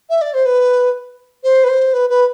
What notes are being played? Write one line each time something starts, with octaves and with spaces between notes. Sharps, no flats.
E5
D5
C5
B4
C5
B4
C5
B4
B4